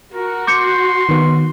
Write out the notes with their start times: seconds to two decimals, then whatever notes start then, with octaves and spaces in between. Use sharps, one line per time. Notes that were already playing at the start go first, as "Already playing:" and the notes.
0.14 F#4 A#4
0.47 C6 D6 G6 C#7
1.09 D#3 B3